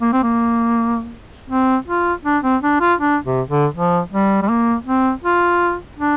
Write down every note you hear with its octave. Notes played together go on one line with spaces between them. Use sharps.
A#3
C4
A#3
C4
F4
D4
C4
D4
F4
D4
C3
D3
F3
G3
G3
A#3
C4
F4
D4